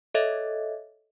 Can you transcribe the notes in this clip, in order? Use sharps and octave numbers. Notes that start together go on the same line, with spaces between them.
A4 C#5 D#5 E5